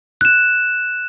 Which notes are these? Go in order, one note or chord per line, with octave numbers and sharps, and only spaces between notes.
F#6 E7